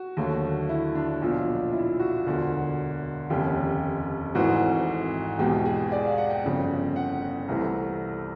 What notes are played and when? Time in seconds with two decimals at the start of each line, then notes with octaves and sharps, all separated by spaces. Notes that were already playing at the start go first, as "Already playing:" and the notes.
Already playing: F#4
0.17 D#2 D3 F#3 A3
0.69 E4
0.95 D4
1.22 B1 A#2 F3
1.73 E4
2.00 F#4
2.26 E1 D2 D3
3.30 F1 D#2 C#3 G4
4.35 G#1 G#2 E3 A3 F#4
5.39 E2 B2 G#3 G4
5.65 G#4
5.92 D5
6.04 F5
6.18 F#5
6.31 G5
6.43 G1 F2 C#3
6.96 F#5
7.48 C2 C3 E3 A3